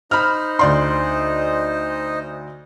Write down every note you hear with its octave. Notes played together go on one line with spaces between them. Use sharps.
D#4 C5 D#5 B5 F6
D2 D5 C6